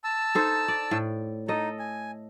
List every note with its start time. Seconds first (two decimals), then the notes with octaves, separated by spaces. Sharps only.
0.04 A5 E6
0.35 D#4 A4 C5
0.68 D5
0.91 A2
1.48 D#4 A4 D#5
1.79 G#5